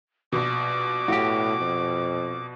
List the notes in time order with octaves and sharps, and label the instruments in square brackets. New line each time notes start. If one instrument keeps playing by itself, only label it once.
[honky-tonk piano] A#1 B2 [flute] D6
[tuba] A2 [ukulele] F#4 G4
[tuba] F2